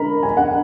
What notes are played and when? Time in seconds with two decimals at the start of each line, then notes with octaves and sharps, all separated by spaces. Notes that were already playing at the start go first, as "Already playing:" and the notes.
Already playing: A#4 A#5 B5
0.23 G#5
0.37 F#5